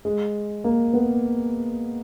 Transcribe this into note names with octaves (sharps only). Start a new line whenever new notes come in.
G#3
A#3
B3